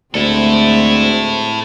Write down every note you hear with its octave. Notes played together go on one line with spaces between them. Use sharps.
D2 G#3 A3 C4 E4 A4